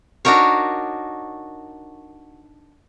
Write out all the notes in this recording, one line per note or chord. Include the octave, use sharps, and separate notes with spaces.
D4 D#4 F#4 A#4 C#5